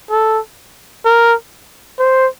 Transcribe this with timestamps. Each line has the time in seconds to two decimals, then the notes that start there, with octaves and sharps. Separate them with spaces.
0.11 A4
1.05 A#4
1.99 C5